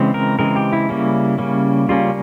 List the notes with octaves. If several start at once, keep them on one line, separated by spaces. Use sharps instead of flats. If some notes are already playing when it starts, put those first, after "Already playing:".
Already playing: C#3 E3 G#3 C4
A#4
C#3 E3 G#3 C4 A#4
G4
E4
C#3 G3 A#3 C#4
C#3 G3 A#3 C#4
C#3 G3 A#3 C#4 F4